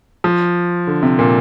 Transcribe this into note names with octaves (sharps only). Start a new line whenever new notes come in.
F3
D3
C3
A#2